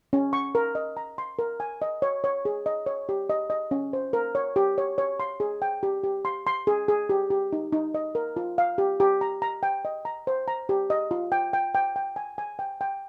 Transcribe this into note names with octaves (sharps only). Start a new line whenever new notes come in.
C#4
C#6
A#4
D#5
A#5
C6
A#4
G#5
D#5
C#5
C#5
G#4
D#5
C#5
G4
D#5
D#5
C#4
C5
A#4
C#5
G4
C#5
C#5
C6
G#4
G5
G4
G4
C6
C6
G#4
G#4
G4
G4
D#4
D#4
D#5
A#4
F4
F5
G4
G4
A#5
A#5
G5
D#5
A#5
C5
A#5
G4
D#5
F4
G5
G5
G5
G5
G#5
G#5
G5
G5